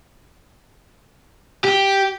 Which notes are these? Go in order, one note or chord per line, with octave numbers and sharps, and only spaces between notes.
G4